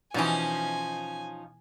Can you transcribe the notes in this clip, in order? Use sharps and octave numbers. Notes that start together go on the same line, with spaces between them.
B2 E3 F3 C#4 D#4 G#5